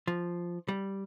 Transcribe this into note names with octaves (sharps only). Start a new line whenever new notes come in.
F3
G3